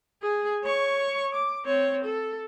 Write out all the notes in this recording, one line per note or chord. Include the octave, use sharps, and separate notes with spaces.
G#4
C#5 C#6
D6
C4 C#5
A4